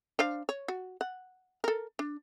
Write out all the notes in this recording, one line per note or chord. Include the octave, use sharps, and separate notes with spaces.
D4 C5 F5
C#5
F#4
F#5
A4 A#4
D4